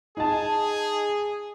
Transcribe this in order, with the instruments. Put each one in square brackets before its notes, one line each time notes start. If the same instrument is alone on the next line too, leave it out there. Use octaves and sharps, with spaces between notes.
[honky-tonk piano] D#4 A5 [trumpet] G#4